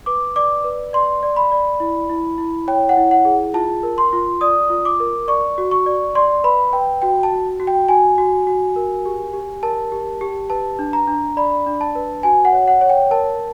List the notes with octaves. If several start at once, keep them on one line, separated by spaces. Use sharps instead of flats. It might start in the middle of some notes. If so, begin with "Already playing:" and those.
B4 D6
D5 D6
B4
D5 C6
D5
B5
D5
E4
E4
E4
C#5 G5
F#5
E4
F#5
G#4
F4 A5
A#4
C6
F4
D5 D#6
F4
D6
A#4
D5 C#6
F#4
C#6
D5
D5 C6
B4 B5
B4 G5
F#4 G5
A5
F#4
F#4
G5
F#4 G#5
F#4
F#4
A#4
G4
G4
A#4 A5
G4
G4
B4 A5
D4
A#5
D4
D5 B5
D4
A5
B4
F#4 G#5
F#5
C#5
F#5
C#5
G5
A#4 A5